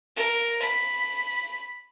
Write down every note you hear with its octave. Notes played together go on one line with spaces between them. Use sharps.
A#4
B5